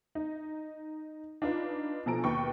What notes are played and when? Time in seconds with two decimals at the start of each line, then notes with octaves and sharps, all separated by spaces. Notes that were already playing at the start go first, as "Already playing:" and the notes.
0.15 D#4
1.42 D4 D#4 F4 B4
2.06 B2 F3 A4 G#5 A#5 D7
2.24 D#2 B2 B4 G5 C#6